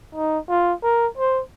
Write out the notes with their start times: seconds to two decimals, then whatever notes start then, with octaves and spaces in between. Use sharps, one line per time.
0.15 D#4
0.49 F4
0.83 A#4
1.18 C5